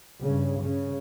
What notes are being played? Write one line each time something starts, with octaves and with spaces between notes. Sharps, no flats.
G2 C#3
C#3